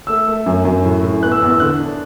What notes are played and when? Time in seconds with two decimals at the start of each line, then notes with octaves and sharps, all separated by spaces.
0.07 A3 E6
0.27 A3
0.46 F#2
0.65 F#2
0.84 A2
1.03 A2
1.22 B3 F#6
1.32 E6
1.42 E2
1.50 E6
1.60 D3 F#6
1.80 D4